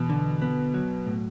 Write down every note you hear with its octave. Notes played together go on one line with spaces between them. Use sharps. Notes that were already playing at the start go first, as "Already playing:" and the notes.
Already playing: E2 B2
D3
B3
F#3
A2